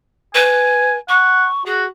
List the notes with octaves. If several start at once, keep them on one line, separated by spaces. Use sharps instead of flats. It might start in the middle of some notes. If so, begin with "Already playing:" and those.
B4 G#5
F#5 C#6
F#4 G#4